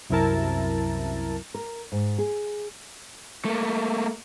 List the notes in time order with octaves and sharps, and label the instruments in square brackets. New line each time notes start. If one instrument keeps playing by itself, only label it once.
[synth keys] C2 F#2 C3 E4 A#4 A5
[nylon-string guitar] A#4
G#2
G#4
[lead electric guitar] A3 A#3